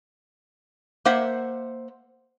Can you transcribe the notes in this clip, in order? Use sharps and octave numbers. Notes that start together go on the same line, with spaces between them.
A#3 C5 E5 F#5